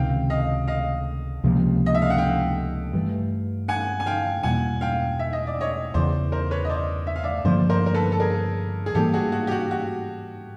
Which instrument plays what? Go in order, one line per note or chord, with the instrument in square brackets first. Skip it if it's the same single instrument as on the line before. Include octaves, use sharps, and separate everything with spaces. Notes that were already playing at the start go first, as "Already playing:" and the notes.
Already playing: [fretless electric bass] C#2 C3 D#3 [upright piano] F5 G5
[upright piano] D#5 F5
D#5 F5
[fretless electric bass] C#2 C3 F3 A#3
[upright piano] D#5
E5
F5
F#5
F5 G5
[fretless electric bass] G2 E3 A3
[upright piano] F#5 G#5
G#5
F5 G5
[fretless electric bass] E2 B2 G3 A#3 [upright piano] F#5 G#5
[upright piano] F5 G5
E5
D#5
D5
C#5 D#5
[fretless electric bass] E2 C#3 E3 [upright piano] C5 D5
[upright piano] A#4 C5
B4 C#5
D#5
C5 D5
E5
F5
D5 E5
[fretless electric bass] G2 D3 F3 A#3 [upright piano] C5 D5
[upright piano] A#4 C5
A#4
A4 B4
A4
G#4 A#4
G#4
[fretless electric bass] G#2 E3 G3 A#3 [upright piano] G4 A4
[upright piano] F#4 G#4
F#4
G4
F#4
F#4